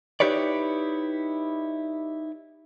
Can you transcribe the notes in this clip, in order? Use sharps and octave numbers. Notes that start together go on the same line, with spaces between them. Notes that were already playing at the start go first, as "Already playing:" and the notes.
D#4 E4 G4 B4 C#5 D5